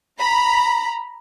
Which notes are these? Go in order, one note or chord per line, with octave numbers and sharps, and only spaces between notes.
A#5 B5